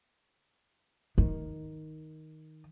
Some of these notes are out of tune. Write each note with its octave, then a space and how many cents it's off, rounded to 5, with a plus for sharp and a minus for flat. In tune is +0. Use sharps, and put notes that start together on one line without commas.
D#3 +5